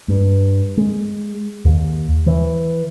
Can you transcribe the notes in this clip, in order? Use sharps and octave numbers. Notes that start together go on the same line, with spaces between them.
G2
G#3
D#2
E3